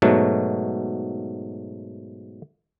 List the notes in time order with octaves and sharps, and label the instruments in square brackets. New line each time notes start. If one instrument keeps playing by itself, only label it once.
[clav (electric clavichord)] G#2 B2 F#3 A3